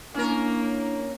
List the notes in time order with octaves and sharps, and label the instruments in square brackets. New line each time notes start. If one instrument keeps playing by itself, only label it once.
[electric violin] A#3 [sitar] C#4 A#4 [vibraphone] D4 E4